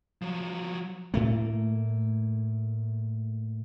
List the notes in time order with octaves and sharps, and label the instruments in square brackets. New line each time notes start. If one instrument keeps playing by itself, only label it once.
[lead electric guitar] F3 F#3
[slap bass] A2 A3 A#3